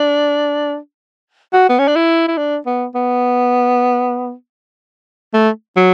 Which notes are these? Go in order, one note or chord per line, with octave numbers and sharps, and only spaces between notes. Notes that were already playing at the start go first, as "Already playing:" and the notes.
Already playing: D4
F#4
B3
C#4
D4
E4
E4
D4
B3
B3
A3
F#3